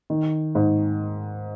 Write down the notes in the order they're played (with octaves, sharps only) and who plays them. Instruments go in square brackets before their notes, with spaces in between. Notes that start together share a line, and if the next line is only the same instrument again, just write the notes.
[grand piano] D#3
G#2